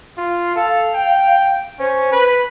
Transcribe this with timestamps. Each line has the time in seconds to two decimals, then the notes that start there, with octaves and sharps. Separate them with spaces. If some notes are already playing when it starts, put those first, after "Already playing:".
0.17 F4
0.56 A4 F5
0.95 G5
1.79 C#4 C5
2.12 B4